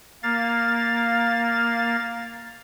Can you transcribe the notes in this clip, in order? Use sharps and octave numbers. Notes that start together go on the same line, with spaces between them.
A#3 F5 A6